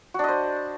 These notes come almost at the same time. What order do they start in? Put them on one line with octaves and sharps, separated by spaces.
F#4 D4 D#5 C5